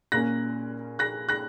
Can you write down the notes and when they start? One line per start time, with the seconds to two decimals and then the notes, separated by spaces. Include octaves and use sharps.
0.12 A#2 A#3 C#4 F#6 A#6
0.99 F#6 A#6
1.29 F#6 A#6